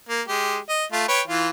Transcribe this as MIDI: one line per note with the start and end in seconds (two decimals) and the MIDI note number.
0.09 0.22 58
0.28 0.58 56
0.28 0.58 67
0.69 0.84 75
0.92 1.04 57
0.92 1.04 65
1.08 1.21 71
1.08 1.21 73
1.08 1.21 79
1.28 1.49 52
1.28 1.49 65